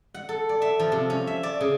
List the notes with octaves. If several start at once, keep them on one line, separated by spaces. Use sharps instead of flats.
F#5
A4
D5
E5
F3
C3
C#4
E5
D5
C#3